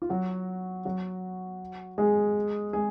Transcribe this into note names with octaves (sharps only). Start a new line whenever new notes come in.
F4
F#3 F#4
F#3 F#4
G#3 G#4
G#3 G#4